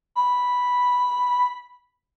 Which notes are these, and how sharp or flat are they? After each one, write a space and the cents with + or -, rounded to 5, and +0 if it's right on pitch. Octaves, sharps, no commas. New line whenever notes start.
B5 -5